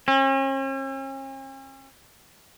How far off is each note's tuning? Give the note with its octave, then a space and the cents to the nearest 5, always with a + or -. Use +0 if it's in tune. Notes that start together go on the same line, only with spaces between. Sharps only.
C#4 -45